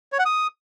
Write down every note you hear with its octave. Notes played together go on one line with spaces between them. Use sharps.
C#5
F#5
D#6